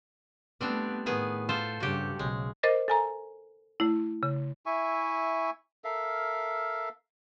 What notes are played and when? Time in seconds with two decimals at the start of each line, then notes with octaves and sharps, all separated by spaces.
0.61 G3 A3 B3 C4 D4
1.06 A2 D#3 B3 G#4
1.49 F4 A4 C5
1.80 G2 C#3 F#4 G4
2.19 B1 C#3 G#3
2.63 A#4 C5 D#5 D6 A6 A#6
2.88 A4 G#5 A#5
3.80 A3 E4
4.23 C#3
4.66 E4 E5 G#5 C#6
5.84 A4 A#4 E5 F5